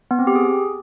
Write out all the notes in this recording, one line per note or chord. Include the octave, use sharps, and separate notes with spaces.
B3
C4
G4
G#4